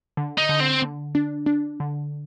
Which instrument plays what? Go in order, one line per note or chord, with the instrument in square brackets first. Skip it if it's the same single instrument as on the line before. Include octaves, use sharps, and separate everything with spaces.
[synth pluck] D3
[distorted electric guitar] D#4
[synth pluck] D3
[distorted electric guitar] C4
[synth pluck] D3
D4
D4
D3